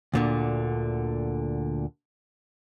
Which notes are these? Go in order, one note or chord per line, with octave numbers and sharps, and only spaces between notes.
D2 A#2 D3